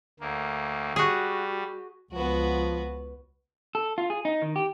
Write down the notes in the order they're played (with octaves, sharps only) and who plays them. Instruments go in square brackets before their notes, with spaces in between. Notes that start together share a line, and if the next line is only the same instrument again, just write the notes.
[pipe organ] D2 A#3
[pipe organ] G3 [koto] F#4 G#4
[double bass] C#2 [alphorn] F3 [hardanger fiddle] B3 F#4
[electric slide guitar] A4
F4
G#4
D#4
D#3
G4